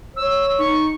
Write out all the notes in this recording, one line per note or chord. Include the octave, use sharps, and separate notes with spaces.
C#5 E6
D#4 C#6